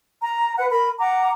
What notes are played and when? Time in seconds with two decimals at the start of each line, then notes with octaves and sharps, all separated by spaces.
0.22 A#5
0.58 B4 F#5
0.70 A#4 B5
0.99 F#5 A#5 D6